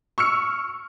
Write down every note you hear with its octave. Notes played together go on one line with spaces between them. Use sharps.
C#6 E6 F6 C#7